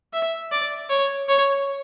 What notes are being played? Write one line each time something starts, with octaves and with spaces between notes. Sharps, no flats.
E5
D5
C#5
C#5